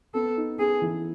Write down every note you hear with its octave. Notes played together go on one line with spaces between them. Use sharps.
B3 A4
D#4
B3 G#4
E3